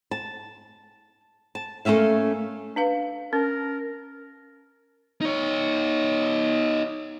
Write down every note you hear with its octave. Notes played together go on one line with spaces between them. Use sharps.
A5
A5
A3 A#3 C#4 E5 F5
D4 B4 F5
C#4 A#4
D#4 C#5